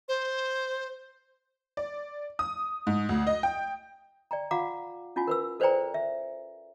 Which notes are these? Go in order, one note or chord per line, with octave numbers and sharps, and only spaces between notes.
C5
D5
D#6
G#2
D2
D#5
G5
D5 G5 A#5
F4 F5 F#5 A#5 D6
C#4 E4 F4 F#5 G#5
A#4 B4 E6
A4 B4 C5 D5 G5 A#5
E5